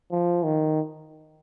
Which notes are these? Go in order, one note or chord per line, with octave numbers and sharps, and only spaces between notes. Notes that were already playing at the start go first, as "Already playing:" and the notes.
F3
D#3